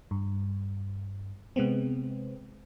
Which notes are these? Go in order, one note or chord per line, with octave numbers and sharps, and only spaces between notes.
G2
C3 G#3 B3 C4